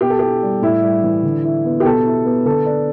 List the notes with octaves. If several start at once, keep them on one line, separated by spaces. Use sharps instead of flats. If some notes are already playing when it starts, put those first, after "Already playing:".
B2 G4
A4
E4 G4
G3
A2 E4
G3
E3
D3
E4
B3
G4
B2 A4
E4
B3
D3 A4
D4